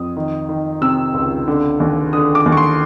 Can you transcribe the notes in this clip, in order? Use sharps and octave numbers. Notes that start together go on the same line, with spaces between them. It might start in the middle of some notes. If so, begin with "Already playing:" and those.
Already playing: F2 D#6
D#3
D#3
C3 E6
C#2
D3
D#2
D3 D#6
D6
D#2
C#6
C6